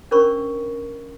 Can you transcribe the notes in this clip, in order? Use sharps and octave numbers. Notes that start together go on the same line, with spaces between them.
C#4 D4 A#4 C5 B5 C#6